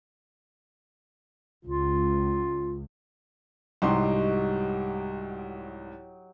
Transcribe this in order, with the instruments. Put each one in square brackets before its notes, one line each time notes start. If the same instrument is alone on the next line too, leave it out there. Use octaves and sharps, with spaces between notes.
[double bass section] C#2 [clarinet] F4
[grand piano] C2 G#2 C6 [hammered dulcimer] F#3 G4 D#5